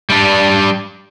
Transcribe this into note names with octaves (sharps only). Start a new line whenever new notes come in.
G3 D4